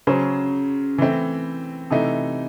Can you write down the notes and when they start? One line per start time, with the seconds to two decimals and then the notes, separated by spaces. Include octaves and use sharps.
0.07 C#3 F#3 C#4 G#4 C5
0.98 E3 A3 C4 E4
1.91 C3 E3 A3 D#4